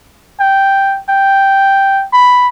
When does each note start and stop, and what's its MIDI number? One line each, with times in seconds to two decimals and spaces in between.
0.40 0.99 79
1.09 2.05 79
2.13 2.48 83